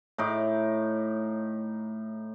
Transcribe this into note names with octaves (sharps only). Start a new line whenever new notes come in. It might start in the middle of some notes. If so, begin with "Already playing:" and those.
A2 D#4 D6